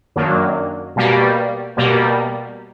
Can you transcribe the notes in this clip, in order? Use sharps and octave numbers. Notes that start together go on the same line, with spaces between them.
F#2 D#3 F#3 A#3 D4
B2 G3 A#3
B2 G3 A#3